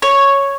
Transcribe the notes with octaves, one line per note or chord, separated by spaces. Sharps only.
C#5